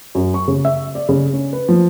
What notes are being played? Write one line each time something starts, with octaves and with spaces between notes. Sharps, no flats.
F#2
C#6
C#3
E5
D5
C#3
C#4
B4
F3